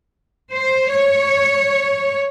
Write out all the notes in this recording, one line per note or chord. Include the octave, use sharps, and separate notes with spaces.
C5
C#5